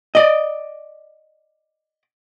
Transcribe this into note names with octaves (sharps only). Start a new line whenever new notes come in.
D5 D#5